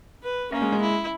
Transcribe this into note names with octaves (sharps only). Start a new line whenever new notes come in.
B4
A#3 C#4
G#3
G#3
E4